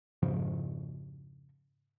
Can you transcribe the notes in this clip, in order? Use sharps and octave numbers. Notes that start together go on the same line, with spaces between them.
F2 G#2 C#3 F3